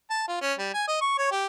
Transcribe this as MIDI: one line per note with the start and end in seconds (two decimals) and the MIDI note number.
0.10 0.23 81
0.28 0.37 65
0.41 0.53 61
0.59 0.69 55
0.74 0.84 80
0.88 0.97 75
1.01 1.14 85
1.18 1.29 73
1.31 1.47 67